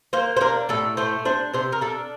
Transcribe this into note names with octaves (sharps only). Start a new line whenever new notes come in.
A#3 C5
C5
D4 A#4
A2 A4
A3 C5
D4 C5
C3 C5
A#4
D4 A4